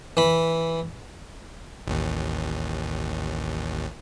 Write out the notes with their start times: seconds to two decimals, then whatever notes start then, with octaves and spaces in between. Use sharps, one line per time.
0.17 E3 B5
1.87 A1 D#2